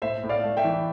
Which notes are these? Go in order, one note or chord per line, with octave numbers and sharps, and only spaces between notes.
A2 C5 E5
A2
D5 F5
A3
E5 G5
E3